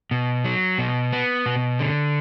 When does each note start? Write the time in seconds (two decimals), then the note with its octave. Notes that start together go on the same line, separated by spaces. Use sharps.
0.11 B2
0.45 F#3
0.78 B2
1.13 B3
1.46 B2
1.79 D3